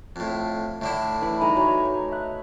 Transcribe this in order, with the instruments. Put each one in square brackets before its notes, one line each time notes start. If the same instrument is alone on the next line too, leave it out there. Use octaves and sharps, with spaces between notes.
[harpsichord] F2 A2
[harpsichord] A2 D3 E4 [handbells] A3
[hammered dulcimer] E3 [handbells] B5
[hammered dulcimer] A3 D#4 [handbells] G#5 A#5
[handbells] F#4 [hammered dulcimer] C#5
[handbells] E5 F#6